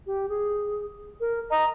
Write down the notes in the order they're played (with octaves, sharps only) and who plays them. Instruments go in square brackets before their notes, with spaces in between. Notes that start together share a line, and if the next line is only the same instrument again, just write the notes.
[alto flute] G4
G#4
A#4
[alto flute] D#5 [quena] A#5